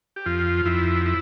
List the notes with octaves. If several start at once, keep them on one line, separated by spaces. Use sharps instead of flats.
G4
F2 F4
F2 E4
E4